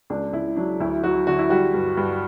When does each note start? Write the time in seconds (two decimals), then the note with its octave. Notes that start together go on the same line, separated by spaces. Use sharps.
0.10 C#2 D4
0.33 C#2 E4
0.56 F#3 D4
0.80 D2 E4
1.04 F#3 F#4
1.27 D3 F#4
1.39 E4
1.50 G3 F#4
1.74 G2
1.97 G2